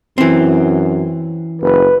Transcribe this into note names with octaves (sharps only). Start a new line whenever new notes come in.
F#2 E3 C4
F#1 B4